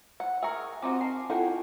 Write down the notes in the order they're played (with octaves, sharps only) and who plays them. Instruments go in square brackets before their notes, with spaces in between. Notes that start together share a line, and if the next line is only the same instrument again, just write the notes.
[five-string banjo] F#5
[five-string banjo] G#4 A#4 [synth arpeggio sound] E5 C#6
[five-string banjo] F3 D#4 F#4 [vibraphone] C4 D6
[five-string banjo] A#4 [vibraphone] G#5 A5 [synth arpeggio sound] C7
[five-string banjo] D#3 C#5 F#5 [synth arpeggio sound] E4 A4 G5 [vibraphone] F4